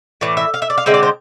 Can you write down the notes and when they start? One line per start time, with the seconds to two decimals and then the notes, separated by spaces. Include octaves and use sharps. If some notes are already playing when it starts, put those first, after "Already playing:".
0.21 A2 E3 D5
0.37 E5
0.54 F5
0.62 E5
0.70 D5
0.78 F5
0.86 D3 G#3 C4 E5
0.94 D5
1.03 C5